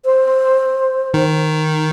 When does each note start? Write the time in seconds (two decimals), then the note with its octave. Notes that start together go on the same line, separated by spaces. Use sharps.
0.05 C5
1.14 D#3